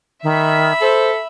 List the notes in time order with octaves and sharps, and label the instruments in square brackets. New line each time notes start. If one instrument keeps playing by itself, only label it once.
[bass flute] D#3 [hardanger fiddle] E5 B5
[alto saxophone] A4 [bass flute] C5